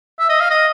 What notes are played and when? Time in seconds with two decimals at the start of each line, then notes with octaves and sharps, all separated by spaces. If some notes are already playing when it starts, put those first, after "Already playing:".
0.19 E5
0.29 D#5
0.40 F5
0.50 D#5